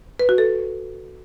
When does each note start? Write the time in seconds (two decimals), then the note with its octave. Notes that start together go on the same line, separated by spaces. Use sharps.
0.20 B4
0.29 F#4
0.38 A4